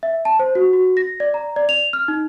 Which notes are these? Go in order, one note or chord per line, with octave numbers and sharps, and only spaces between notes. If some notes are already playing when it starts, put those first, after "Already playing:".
E5
A5
C5
F#4
F#4
A#6
D5
A#5
D5
F7
F6
D#4